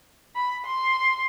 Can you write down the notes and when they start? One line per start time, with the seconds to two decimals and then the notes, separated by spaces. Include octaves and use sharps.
0.35 B5
0.65 C6